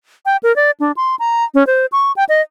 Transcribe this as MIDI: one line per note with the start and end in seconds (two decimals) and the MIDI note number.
0.26 0.37 79
0.43 0.55 70
0.56 0.71 74
0.80 0.92 62
0.97 1.15 84
1.19 1.44 82
1.54 1.66 61
1.67 1.86 72
1.92 2.12 85
2.16 2.24 79
2.29 2.41 75